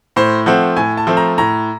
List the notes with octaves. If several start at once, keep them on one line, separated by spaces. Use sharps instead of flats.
A2 C5
F3 A3 C4 F#5
A2 G#5
A5
F3 A3 C4
A#5
A2 A#5